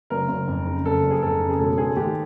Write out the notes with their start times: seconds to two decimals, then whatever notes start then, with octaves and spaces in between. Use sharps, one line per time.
0.10 F#1 A#4
0.29 F#1
0.48 F2
0.66 C#3
0.84 F#1 A4
1.03 F#1
1.11 G#4
1.22 F2 A4
1.40 C#3
1.49 G#4
1.59 E1 A4
1.78 G#3 G#4
1.96 D#2 G4